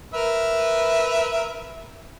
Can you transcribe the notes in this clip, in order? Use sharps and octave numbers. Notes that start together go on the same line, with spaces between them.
A#4 B4 E5